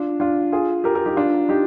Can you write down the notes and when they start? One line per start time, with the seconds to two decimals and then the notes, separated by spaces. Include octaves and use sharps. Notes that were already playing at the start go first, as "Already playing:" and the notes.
Already playing: D4 F4
0.20 D4 F4
0.52 F4 G#4
0.84 G4 A#4
0.95 G4 A#4
1.06 D#4 G4
1.16 D4 F4
1.49 D#4 G4